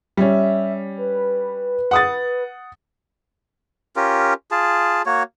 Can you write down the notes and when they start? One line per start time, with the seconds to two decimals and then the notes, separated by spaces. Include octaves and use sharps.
0.17 G3 C#4 E5
0.98 B4
1.91 F#5 D#6 A6
3.96 C#4 F4 G4 A#4
4.51 F4 G#4 A5
5.06 A#3 F#4 C#5